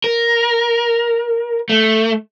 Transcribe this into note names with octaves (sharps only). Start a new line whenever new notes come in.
A#4
A3